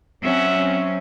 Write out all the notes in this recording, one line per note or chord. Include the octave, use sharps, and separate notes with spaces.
F#3 C4 C#4 E5 F#5